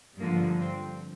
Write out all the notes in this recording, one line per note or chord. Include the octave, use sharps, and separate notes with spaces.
G2 D3 F3 A#3
C4